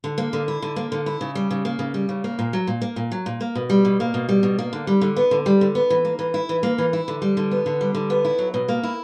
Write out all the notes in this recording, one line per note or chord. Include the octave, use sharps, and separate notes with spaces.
D3
A#3
D3
E4
D3
A#3
D3
E4
C#3
G3
C#3
A#3
C#3
G3
C#3
A#3
A#2
F#3
A#2
A#3
A#2
F#3
A#2
A#3
B2
G3
B2
A#3
B2
G3
B2
A#3
D3
G3
D3
B3
D3
G3
D3
B3
E3
A#3
E3
E4
E3
A#3
E3
E4
D3
G3
D3
B3
D3
G3
D3
B3
E4
F#3
B2
A#3
E4